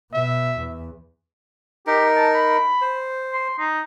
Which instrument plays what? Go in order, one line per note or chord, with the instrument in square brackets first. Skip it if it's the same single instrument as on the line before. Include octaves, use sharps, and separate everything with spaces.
[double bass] B2 [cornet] E5
[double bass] E2
[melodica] D#4 A#4 [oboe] G4
[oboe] A5
B5
[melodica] C5
[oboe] C6
D#4